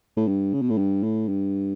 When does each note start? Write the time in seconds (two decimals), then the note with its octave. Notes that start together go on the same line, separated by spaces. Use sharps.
0.17 A2
0.28 G2
0.54 C#3
0.62 B2
0.70 A2
0.78 G2
1.03 A2
1.28 G2